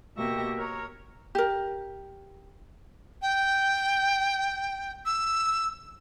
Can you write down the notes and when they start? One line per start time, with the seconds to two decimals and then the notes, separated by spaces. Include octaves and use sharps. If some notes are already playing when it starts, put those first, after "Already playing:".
0.16 B2 A#3 G4 E5 C#6 A#6
0.57 A#4 C#5 A#5
1.35 G4 A#4
3.22 G5
5.05 E6